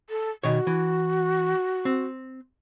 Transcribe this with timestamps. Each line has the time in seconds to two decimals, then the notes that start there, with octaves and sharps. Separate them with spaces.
0.10 A4
0.44 B2 D#3 F#4 C#5
0.67 E3
1.85 C4